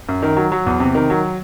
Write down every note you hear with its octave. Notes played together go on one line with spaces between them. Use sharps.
F#2
D#3
F#3
F#3
E2
C3
D#3
F#3